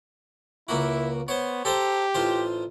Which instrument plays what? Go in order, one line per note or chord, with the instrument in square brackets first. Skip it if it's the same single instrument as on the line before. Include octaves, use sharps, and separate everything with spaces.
[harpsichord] C#2 A#3 F#4 [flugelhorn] E4
[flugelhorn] B3 [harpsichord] C5 C#5
[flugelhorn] G4 [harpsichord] A4 C5 A#5
[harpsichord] A1 F4 C5